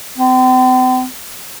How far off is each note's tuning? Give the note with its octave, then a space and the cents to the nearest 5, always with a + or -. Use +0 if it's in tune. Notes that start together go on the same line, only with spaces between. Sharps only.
C4 -40